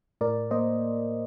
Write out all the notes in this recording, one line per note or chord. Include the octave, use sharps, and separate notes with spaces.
A2 A#4 D5
A#3 C5 D#5